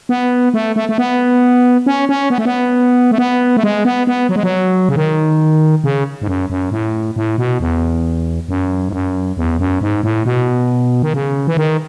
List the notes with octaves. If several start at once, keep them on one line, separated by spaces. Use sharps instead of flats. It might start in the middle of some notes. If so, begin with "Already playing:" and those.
B3
A3
A3
A3
B3
C#4
C#4
B3
A3
B3
A3
B3
A3
G#3
B3
B3
F#3
G#3
F#3
C#3
D#3
C#3
G#2
F#2
F#2
A2
A2
B2
E2
F#2
G#2
F#2
E2
F#2
G#2
A2
B2
D#3
C#3
E3
D#3